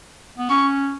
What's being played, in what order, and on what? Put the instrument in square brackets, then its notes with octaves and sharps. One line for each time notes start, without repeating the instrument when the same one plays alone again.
[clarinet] B3
[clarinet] C#4 [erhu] C#6